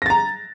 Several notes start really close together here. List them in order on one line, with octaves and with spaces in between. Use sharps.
A#6 A6 A#5